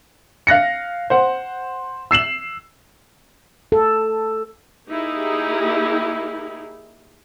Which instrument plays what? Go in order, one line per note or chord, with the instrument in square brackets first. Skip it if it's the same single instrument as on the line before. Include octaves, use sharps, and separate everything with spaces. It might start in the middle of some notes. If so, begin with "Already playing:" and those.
[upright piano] F5 F#6 A#6 C#7
C5 F#5
E6 C7 E7 F#7
[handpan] A4
[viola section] A#3 D#4 E4 G4 G#4